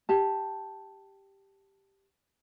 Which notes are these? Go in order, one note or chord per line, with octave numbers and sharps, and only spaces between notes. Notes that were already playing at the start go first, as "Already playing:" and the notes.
G4 A5